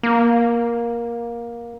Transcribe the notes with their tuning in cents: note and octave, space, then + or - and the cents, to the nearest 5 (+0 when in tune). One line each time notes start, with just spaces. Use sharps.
A#3 +15